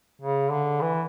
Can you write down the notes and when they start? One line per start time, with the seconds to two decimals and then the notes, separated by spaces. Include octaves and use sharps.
0.22 C#3
0.51 D3
0.81 E3